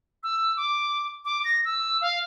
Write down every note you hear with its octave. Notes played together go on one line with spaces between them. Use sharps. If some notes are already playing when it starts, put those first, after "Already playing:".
E6
D6
D6
A#6
E6
F5